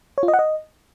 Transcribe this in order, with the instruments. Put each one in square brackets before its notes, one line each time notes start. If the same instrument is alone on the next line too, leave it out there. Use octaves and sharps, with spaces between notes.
[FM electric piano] C#5
F4
D#5
F#5
D#5